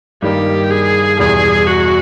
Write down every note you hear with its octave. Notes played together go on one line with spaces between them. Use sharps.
G2 D#3 G3 A#3 G4
G#4
E2 B2 G3 G#4
F#4